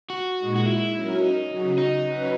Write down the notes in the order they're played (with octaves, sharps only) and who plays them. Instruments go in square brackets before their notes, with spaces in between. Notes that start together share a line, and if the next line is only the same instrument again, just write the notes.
[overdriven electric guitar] F#4
[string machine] A#2 G#3 D#4
[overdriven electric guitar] F#4
E4
[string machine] F#3 C#4 F#4 A#4
[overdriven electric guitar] D#4
[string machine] C#3 F#3 C#4 F#4
[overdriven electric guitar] D#4
[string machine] F#3 C#4 F#4 B4